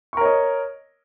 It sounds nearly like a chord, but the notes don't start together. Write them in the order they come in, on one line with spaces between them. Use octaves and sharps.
C#6 A#4 C#5 D#5